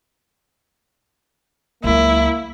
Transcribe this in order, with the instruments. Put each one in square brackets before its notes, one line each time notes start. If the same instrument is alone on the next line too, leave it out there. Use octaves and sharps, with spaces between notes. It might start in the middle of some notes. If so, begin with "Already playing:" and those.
[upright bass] C#2 F#3 [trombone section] A#3 [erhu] E4